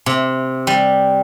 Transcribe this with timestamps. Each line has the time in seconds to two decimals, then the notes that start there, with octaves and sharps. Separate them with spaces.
0.06 C3
0.67 G3